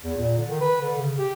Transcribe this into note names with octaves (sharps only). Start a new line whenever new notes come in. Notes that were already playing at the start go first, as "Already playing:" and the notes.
E2
A#2
D3
D#3
B4
D3
C#3
G4